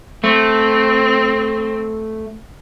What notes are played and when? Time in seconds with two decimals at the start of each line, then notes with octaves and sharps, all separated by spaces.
0.24 A3 C4